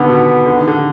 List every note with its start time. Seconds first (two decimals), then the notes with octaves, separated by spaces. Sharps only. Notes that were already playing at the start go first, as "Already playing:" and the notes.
Already playing: D3 D#3 B3
0.08 B2
0.46 D3
0.57 D#3
0.68 D3